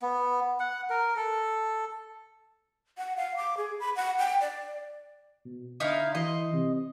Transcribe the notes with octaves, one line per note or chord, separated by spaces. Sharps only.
B3
F#5
A#4
A4
F#5
F5
D6
G#4
B5
F#5
G5
D5
B2
D3 D#4 E4 F5
E3 D#5 C6
C3